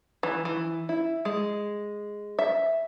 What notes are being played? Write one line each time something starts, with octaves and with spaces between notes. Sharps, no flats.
E3
E3
E4
G#3
E5